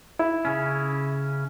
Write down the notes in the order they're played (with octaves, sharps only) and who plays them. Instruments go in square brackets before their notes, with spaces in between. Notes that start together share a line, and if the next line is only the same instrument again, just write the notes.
[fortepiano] E4
[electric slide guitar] C#3 C#4